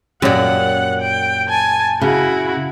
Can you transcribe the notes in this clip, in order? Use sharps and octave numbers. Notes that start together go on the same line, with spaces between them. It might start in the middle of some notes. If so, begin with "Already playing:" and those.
F#2 A#2 G4 C#5 D5 F#5
G5
G#5 A5
C#3 E4 F#4